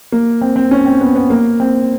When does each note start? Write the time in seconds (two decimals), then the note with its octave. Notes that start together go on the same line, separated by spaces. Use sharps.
0.12 A#3
0.41 C4
0.56 C4
0.71 C#4
0.86 C4
1.01 B3
1.15 B3
1.30 A#3
1.60 C4